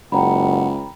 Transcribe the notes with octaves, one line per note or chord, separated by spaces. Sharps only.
F#1 C#2 F#5 G5 A#5 B5